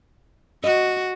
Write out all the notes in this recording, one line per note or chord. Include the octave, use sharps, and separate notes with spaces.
F#4 D#5